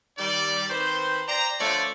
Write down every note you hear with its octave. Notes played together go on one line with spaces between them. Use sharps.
D#3 G3 D5
D#3 C4 B4 C5
C5 D5 G5 A#5
D3 F3 A3 C#5 D5